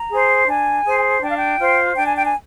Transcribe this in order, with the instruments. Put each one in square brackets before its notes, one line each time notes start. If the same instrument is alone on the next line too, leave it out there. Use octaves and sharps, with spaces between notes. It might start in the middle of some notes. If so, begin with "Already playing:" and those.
Already playing: [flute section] A#5
G#4 C5
D4 G#5
G#4 C5
D4 G5
F5
G5
F4 C5
D4 G5
G#5
G5
G#5